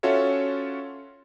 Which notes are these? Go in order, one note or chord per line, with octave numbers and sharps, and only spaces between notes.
C#4 F4 F#4 A4 C#5 E5